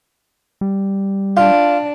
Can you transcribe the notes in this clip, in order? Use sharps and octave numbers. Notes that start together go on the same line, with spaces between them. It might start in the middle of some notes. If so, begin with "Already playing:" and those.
G3
D4 F4